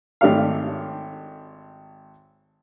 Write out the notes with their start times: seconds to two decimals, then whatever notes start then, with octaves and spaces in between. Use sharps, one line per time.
0.21 G#1 A3 G4 C#5 D5 F5